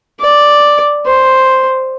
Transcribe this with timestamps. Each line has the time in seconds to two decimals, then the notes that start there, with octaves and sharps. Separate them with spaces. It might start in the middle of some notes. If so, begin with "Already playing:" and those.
0.21 D5
1.06 C5